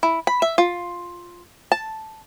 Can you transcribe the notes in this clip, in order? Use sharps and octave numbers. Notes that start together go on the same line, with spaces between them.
E4
B5
E5
F4
A5